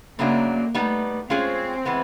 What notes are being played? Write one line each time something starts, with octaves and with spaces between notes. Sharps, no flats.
F#2 C#3 F#3 A3 A#3 D4
G3 A3 B3 D#4
G#3 C4 C#4 F4 G#4
E3 G#3 B3